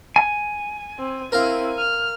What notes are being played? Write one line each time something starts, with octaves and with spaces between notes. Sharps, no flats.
G#5
C4
C4 E4 A#4 F5
F6